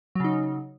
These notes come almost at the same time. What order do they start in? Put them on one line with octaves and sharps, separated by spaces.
F#3 C#3 D#4